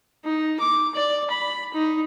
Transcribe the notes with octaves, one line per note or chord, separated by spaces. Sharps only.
D#4
D6
D5
B5
D#4